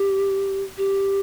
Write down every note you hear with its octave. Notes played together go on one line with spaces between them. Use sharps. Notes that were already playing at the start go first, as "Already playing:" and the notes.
Already playing: G4
G4